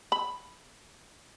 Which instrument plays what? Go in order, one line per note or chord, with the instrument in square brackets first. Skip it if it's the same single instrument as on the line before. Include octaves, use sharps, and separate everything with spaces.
[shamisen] B5